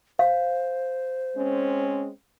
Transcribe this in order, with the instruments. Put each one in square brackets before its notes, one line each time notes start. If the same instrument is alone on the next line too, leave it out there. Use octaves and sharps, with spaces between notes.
[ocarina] C5 [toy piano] F5
[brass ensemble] G#3 C4 C#4